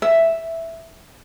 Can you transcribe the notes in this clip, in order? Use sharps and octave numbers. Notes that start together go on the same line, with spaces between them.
E5